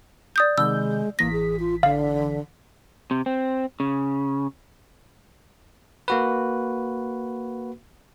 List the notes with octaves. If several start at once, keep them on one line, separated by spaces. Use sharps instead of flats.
D5 D#6 G6
C3 D#3 G#3 E6 G6
A1 E3 A#3 A#6 B6
G#4
F4
D3 F5
C3
C4
C#3
A#3 F#4 B4